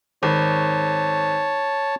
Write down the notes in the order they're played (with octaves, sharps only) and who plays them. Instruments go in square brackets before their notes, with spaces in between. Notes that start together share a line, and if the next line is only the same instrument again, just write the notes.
[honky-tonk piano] G#1 [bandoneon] C#5 A5